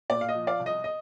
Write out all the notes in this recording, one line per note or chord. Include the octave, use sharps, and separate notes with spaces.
A#2 D5
F5
D#5
F3
D5 F5
C2
D#5
D#5